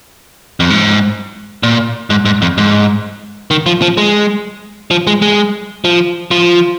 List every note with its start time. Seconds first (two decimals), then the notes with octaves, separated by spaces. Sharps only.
0.60 F2
0.70 G#2
1.63 A#2
2.10 G#2
2.25 G#2
2.42 F2
2.58 G#2
3.51 D#3
3.66 F3
3.82 F3
3.97 G#3
4.91 F3
5.07 G#3
5.22 G#3
5.85 F3
6.31 F3